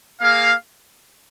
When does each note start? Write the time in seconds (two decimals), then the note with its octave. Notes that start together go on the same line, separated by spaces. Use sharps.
0.21 A#3 G#4 F5